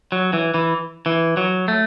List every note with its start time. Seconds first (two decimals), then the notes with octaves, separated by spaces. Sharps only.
0.12 F#3
0.33 E3
0.54 E3
1.06 E3
1.37 F#3
1.68 A3